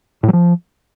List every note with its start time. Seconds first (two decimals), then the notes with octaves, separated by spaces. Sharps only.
0.23 A2
0.28 F#3
0.33 F3